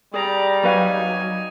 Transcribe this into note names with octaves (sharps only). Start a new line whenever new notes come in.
G3 G#4 D5 A#5
F#3 D#4 F#4 B4 F5 G#5